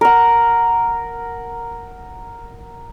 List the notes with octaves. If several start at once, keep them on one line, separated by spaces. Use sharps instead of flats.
A#4 F#5